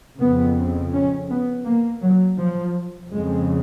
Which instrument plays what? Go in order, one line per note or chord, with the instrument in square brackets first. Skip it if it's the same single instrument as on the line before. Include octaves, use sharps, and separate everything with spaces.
[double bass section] F2 C#3 B3
C#4
B3
A#3
F#3
F3
F2 C#3 G#3